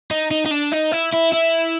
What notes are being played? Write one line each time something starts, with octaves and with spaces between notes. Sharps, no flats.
D#4
D#4
D#4
D4
D#4
E4
E4
E4